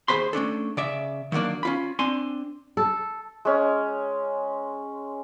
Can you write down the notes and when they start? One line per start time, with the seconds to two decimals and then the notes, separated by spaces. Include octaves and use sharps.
0.08 D#2 G#4 C5 B5 C6
0.33 A3 C#4 D4 A4
0.77 C#3 D5 E5
1.32 D#3 F#3 A3 A#3 D4
1.63 C#4 F4 B5
1.99 C4 D4 G#5 C6
2.77 A4
3.45 G#3 C#4